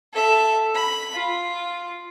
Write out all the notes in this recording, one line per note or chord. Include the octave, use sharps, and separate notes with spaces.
A4 E5
B5
F4